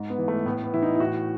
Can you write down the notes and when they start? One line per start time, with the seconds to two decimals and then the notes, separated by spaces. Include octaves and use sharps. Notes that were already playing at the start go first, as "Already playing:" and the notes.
Already playing: G#2
0.10 B3
0.18 E3
0.28 A3
0.46 A2 B3
0.64 B3
0.73 E3 E4
0.82 D#4
0.95 E4
1.00 A2 F#4